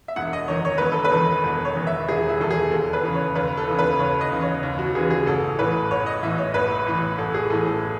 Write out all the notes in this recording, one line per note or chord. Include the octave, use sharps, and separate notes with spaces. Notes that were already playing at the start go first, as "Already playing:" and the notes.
E5
E1 F#5
D#5
E2 D#3 C#5
C#5
E1 B4
A4
B4
E2 D#3
E1
C#5
E2 D#3
E5
E1 G#4
E4
E2 D#3 A4
G#4
D#2 A4
B4
C#3 E3
C#5
D#2 B4
A4
C#3 E3
B4
D#2 C#5
D#5
C#3 E3
C#5
D#2
F#4
C#3 E3 G#4
G#4
A1 A4
A2 E3 B4
A1 C#5
D#5
A2 E3 E5
C#5
A1 B4
A2 E3
A1 A4
G#4
A2 E3 A4
A4